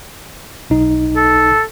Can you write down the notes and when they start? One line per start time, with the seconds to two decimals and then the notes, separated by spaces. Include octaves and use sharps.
0.70 B1 D#4
1.16 A4